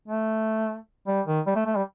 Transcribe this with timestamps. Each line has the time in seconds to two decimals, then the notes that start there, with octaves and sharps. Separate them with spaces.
0.08 A3
1.08 G3
1.27 D#3
1.47 G3
1.56 A3
1.66 A3
1.76 G3